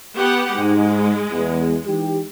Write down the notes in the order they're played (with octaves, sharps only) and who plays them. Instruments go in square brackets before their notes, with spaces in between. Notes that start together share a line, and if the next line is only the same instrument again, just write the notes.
[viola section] B3 G4 F#5
[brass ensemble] G#2 [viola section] G#3
[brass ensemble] E2
E3 D#4 G4